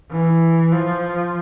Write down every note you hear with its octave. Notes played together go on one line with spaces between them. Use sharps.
E3
F3